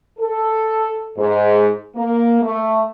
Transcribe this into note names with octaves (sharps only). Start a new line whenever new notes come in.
A4
G#2
A#3
A3